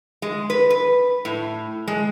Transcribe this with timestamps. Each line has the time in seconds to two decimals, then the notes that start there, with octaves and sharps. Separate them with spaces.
0.22 G#3
0.50 B4
0.70 B4
1.25 A2
1.88 G#3